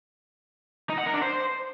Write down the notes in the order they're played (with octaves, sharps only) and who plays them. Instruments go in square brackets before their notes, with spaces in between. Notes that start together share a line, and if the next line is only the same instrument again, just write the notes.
[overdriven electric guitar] D#4
F#5
A#4
D4
C5